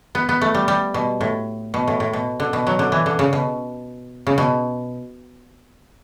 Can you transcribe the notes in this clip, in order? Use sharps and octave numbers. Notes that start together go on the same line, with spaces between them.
B3
B3
A3
G3
G3
B2
A2
B2
A2
A2
B2
D3
B2
F#3
D3
E3
D3
C#3
B2
C#3
B2